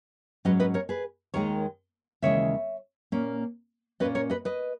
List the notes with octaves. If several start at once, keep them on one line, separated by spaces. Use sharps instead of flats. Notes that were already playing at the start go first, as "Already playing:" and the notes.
G#2 F#3 C#4 B4 D#5
B4 D#5
A#4 C#5
G#4 B4
D#2 D#3 G#3 A#4 C#5
D#2 C#3 E3 G#3 C#5 E5
A#2 A#3 C#4
A#2 A#3 C#4 B4 D#5
A#4 C#5
B4 D#5
B4 D#5